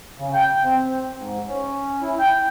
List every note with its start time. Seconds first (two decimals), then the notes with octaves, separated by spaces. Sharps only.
0.19 C#3
0.34 G5
0.64 C4
1.18 G#2
1.48 C#4
2.02 E4
2.19 G5